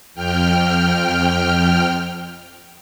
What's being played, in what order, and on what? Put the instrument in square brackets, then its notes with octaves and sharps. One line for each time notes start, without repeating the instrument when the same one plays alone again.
[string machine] F2 G5 F6